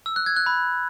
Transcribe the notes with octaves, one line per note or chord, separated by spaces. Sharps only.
E6
F#6
G#6
F#6
B5